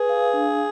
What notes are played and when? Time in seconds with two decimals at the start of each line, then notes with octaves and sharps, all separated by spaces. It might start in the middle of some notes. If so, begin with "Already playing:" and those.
Already playing: G#4 B4
0.09 F5
0.34 D4